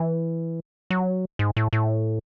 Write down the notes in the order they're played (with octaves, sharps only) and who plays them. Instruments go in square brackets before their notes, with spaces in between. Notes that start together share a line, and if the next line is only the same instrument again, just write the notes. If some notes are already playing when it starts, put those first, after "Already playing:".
Already playing: [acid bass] E3
F#3
G#2
A2
A2